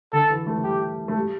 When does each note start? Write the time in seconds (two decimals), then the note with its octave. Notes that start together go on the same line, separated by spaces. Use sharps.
0.13 D3 A4
0.30 E3
0.47 A3
0.58 A3
0.64 G3 G4
1.08 A3
1.15 G3